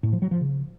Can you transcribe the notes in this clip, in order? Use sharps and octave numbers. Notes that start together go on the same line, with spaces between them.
A2
F3
F#3
F3
C#3